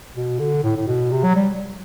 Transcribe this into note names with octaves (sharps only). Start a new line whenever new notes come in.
B2
D3
A2
A2
B2
C3
F#3
G3